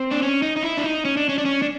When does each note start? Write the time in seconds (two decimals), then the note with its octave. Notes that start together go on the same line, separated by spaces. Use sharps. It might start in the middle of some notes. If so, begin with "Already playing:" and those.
Already playing: C4
0.11 D4
0.22 C#4
0.42 D#4
0.56 D#4
0.63 E4
0.77 D4
0.84 D#4
1.05 C#4
1.17 D4
1.29 C#4
1.38 D4
1.45 C#4
1.62 D4